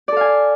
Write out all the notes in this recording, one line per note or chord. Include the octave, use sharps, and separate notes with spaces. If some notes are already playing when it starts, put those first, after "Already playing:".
A4 D5 F5 G#5